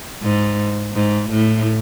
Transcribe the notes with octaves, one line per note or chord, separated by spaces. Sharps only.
G#2
G#2
A2